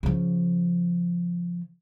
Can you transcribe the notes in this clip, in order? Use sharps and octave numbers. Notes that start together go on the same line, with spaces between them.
C#3 F3